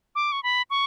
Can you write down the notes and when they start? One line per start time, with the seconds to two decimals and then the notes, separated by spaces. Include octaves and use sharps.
0.15 D6
0.32 C#6
0.43 B5
0.70 C#6